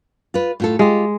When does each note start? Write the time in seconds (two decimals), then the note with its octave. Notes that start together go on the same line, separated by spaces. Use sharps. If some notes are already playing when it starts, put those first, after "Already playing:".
0.34 F4 B4
0.60 A2 F4 A4
0.79 G#3 F4 G4